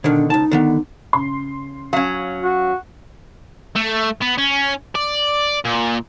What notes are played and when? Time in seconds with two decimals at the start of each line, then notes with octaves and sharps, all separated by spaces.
0.04 B2 D3 D#3 D4
0.30 C#2 D#4 A5
0.51 D3 D#3 B3
1.13 C#3 C6
1.93 F#3 C#4 F5
2.42 F#4
3.76 A3
4.22 B3
4.38 C#4
4.95 D5
5.65 A#2